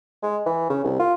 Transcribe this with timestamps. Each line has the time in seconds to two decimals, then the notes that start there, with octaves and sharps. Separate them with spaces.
0.23 G#3
0.46 E3
0.70 C#3
0.84 C2
0.99 F4